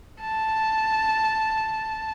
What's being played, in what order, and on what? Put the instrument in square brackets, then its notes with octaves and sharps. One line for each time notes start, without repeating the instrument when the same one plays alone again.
[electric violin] A5